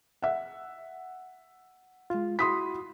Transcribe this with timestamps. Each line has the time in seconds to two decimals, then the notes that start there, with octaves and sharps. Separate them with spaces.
0.22 E5 F#5
2.10 G#3 F4
2.39 E4 F#4 B5 C6 D#6 B6